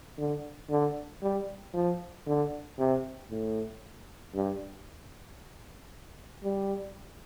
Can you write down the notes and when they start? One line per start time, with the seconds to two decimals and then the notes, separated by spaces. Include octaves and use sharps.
0.18 D3
0.69 D3
1.22 G3
1.73 F3
2.26 D3
2.78 C3
3.30 A2
4.35 G2
6.43 G3